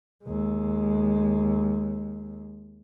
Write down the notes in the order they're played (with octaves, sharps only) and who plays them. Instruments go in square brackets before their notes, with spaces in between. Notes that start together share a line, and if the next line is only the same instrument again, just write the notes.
[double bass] D#2 G#3